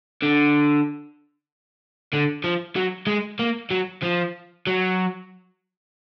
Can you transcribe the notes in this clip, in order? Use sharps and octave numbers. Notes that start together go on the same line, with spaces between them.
D3
D3
F3
F#3
G#3
A#3
F#3
F3
F#3